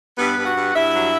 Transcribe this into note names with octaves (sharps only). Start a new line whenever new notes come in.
G2 B3 B4
G2
F#4 F#5
G2
G2 E4 E5
F#3